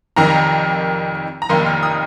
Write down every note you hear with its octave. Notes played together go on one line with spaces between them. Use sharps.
F1 F2 D#3 A#5
A#5
F1 F2 D#3 A#3 D#4 C6
F6
D#6